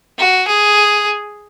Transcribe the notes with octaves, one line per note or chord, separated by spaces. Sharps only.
F#4
G#4